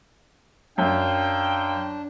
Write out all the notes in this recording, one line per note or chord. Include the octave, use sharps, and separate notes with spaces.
F#2 D4 F5 G5